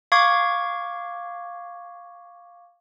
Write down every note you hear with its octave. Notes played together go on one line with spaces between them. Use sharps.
F5 C#6 D6 G#6